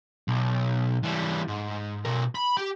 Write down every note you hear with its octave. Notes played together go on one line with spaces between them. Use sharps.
B1
E3 G3
G#2
B2 A#4
B5
G4